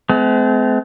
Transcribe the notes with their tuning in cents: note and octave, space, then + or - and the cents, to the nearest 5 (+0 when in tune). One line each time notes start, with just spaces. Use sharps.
G#3 +45 C4 -40